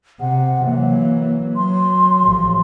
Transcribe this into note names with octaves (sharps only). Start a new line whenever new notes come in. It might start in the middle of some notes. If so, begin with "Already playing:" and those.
C3 F#5
E3 F#3 A#3
F#3 C6
A1 F3